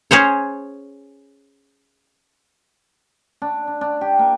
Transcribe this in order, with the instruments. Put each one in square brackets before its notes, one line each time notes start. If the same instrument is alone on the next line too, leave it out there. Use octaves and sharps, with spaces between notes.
[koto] C#4 G#4 C5 C#5
[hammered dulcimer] D4
D4
D4
G4
A#3